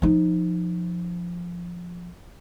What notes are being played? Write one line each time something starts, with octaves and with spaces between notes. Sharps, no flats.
F3 D#4